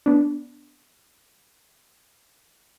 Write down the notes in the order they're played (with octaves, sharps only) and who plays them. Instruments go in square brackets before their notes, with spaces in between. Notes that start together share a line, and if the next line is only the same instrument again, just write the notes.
[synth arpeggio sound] B3 D4